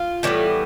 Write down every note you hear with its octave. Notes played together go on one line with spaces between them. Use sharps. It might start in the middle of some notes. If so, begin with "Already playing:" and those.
Already playing: F4
A2 E3 G3 B3